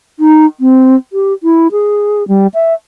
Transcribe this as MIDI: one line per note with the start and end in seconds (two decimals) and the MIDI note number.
0.19 0.46 63
0.60 0.95 60
1.13 1.33 67
1.43 1.68 64
1.72 2.26 68
2.28 2.47 55
2.54 2.74 76